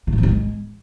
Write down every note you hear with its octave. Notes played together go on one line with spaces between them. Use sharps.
B2
A2
F2
B2
G#3